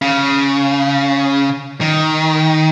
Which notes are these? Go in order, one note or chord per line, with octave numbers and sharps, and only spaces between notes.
C#3
D#3